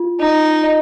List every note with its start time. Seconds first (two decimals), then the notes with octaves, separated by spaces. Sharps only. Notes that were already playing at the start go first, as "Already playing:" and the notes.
Already playing: F4
0.20 D#4 D#5
0.63 D#5